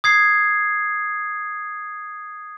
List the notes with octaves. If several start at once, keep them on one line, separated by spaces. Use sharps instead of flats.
D#6 G#6 C7